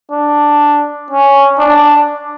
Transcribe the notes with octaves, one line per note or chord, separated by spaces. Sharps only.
D4
C#4
D4